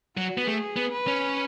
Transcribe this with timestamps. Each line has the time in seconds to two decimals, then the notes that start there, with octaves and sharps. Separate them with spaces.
0.17 F#3 F#4
0.38 B3
0.46 A3 G#4
0.76 B3
0.92 B4
1.07 C#4